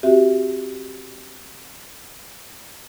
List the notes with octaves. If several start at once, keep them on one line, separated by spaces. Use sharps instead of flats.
C4 F#4 G4 E5